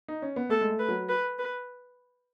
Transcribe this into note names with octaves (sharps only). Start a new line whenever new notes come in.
D#4
C#4
B3
A3 A4
G#3
A3
B4
F#3
B4
B4